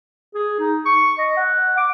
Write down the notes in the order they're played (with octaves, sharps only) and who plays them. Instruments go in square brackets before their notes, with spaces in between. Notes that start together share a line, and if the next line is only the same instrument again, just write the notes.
[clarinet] G#4
D#4
C#6
D#5
F#5
D6